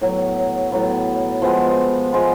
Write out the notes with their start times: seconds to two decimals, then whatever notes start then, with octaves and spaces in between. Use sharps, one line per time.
0.01 A2 F#3 B3
0.72 A2 F#3 B3
1.42 F3 G#3 B3
2.12 F3 G#3 B3